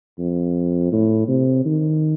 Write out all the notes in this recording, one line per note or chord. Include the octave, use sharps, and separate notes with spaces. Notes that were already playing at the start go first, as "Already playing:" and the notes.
F2
A2
C3
D#3